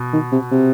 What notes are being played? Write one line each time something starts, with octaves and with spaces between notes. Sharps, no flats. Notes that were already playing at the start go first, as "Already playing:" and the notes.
Already playing: B2
D#3
C3
C3